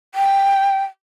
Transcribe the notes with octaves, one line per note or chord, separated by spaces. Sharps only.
G5